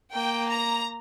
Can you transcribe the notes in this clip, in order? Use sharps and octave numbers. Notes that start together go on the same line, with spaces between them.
A#3 G5
A#5